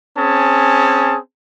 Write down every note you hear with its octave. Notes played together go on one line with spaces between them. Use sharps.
C4 C#4 G#4 A5